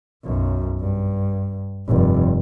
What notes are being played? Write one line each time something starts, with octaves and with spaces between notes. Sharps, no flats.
B1 F#2
G2
F1 G2